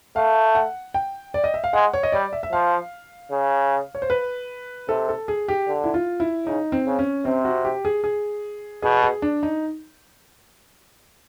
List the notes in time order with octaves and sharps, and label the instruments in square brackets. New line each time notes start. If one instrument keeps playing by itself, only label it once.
[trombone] A3 [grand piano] F5
[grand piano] F#5
G5
D5
D#5
E5
F5
[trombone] G#3 [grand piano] F#5
[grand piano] C#5
D#5
[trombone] G3 [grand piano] D5
[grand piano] E5
E5
[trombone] F3 [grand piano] F5
[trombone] C#3
[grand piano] C#5
C5
B4
[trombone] C3 [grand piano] A4
[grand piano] A4
G#4
G4
[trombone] D3
[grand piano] E4
F4
E4
[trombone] C#3 [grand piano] D#4
[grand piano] C4
[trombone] C#3
[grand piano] C#4
[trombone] C3 [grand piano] C4
[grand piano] F#4
G4
G#4
G#4
[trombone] B2 [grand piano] G#4
[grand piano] G#4
D4
D#4